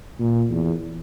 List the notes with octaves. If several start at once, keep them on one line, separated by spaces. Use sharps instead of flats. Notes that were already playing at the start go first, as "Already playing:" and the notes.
A#2
E2